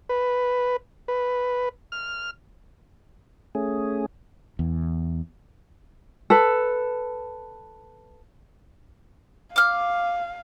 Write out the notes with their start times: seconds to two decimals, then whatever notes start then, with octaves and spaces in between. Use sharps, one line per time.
0.09 B4
1.08 B4
1.92 F6
3.55 A3 C#4 G#4
4.59 E2
6.30 A4 B4
9.56 F5 D6 F6